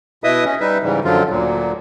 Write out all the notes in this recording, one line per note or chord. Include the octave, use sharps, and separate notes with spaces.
B2 E4 B4 D#5 E5 D#6
C#4
G3 D#4 B4 E5
G#2 C#3 E3 G3
F#2 D3 F3 F#3 F4
D2 A#2 F#3